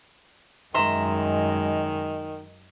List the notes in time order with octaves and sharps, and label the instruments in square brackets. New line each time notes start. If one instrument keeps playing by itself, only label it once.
[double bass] F#2 G#3 [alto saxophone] D#3 [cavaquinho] E5 A#5 C6